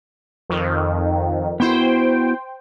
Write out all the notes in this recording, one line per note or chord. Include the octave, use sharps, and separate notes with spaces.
F2 D#3
B3 E4 F#4 C5 G5